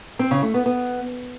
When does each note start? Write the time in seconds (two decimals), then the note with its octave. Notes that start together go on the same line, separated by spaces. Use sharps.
0.19 C4
0.31 C#3
0.43 A3
0.54 B3
0.66 B3